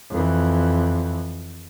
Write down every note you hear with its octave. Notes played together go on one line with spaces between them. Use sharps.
F2 E3